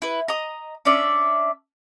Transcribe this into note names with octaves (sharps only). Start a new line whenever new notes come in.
E4 B4
D#5 A#5 D#6
C#4 D4 D5 E5